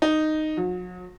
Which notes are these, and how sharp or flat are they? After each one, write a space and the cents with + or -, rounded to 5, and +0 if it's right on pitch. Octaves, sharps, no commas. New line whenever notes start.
D#4 -5
F#3 -40